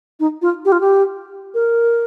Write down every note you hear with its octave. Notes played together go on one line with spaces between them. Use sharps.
D#4
F4
G4
F4
G4
A#4